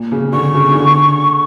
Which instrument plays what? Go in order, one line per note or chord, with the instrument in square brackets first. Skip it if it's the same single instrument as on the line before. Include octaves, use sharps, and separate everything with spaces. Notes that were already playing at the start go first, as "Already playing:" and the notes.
Already playing: [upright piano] A#2
C#3
[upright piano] D3 [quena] C#6
[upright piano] C#3
C#3
D3